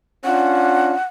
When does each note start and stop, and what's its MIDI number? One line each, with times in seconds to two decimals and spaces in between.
0.25 0.93 61
0.25 0.93 62
0.25 0.93 65
0.25 1.05 78